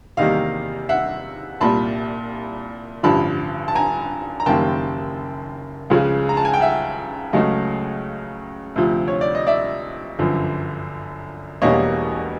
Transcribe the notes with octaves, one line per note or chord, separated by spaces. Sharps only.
E2 C3 D#3 G3 A#3 D#5 F5
E5 F#5
C2 A#2 G3 A5 B5
A1 G2 D3 F3 A5 B5
A5
G#5 A#5
A#5
F#1 F#2 D#3 G3 A#3 G5 A5
C#2 C#3 F3 G#3
A#5
A5
G#5
G5
E5 F#5
C#2 C#3 F#3 A3 D#5 F5
D2 C3 F3
C#5
D5
D#5
D5 E5
G1 F#2 D3 F3
E1 E2 B2 G3 A#3 C#5 D#5